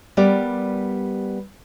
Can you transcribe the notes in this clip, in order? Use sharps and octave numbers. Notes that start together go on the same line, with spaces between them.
G3 B3 G4 A#4 D5